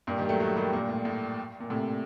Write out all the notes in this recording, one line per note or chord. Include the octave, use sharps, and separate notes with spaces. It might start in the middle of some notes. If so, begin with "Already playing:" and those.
G2 A#2
D#3 G3
F#3 A3
F#3 A3
D#3 G3
G2 A#2
A2
A2
A#2
A2 C3